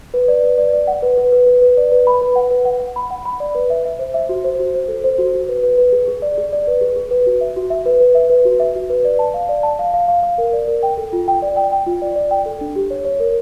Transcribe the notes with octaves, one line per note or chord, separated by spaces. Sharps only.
B4
D5
B4
D5
D5
F#5
B4
B4
B4
B4
B4
D5
B4
B5
B4
F#5
B4
F#5
F#5
B5
F#5
B5
D5
B4
E5
E5
C5
E5
F#4
C5
F#4
C5
A4
C5
F#4
F#4
B4
B4
B4
G#4
G#4
D5
G#4
D5
B4
G#4
G#4
B4
F#4
E5
F#4
E5
B4
B4
E5
B4
F#4
E5
F#4
B4
D5
A5
F5
D5
A5
F5
F5
F5
F5
A#4
D5
A#4
G5
A4
F4
G5
D5
G5
G5
F4
D5
D5
G5
A4
D4
G4
C#5
C#5
A#4